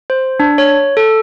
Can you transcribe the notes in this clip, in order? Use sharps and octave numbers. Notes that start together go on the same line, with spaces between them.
C5
D4
C#5
A4